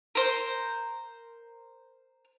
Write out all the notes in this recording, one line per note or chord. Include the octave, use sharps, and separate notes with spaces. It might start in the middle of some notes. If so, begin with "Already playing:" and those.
A#4 C5